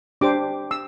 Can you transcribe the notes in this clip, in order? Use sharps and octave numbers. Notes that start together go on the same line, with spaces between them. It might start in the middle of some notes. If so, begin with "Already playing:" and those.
D4 G4 C5 D6
E6